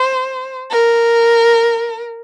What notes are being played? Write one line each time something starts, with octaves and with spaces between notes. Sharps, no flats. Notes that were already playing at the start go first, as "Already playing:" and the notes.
Already playing: C5
A#4